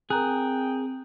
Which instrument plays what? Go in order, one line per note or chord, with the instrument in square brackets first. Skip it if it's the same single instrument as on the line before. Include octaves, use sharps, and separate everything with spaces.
[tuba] C4 [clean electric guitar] G#4 [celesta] A#4 A#5 F#6 [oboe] G5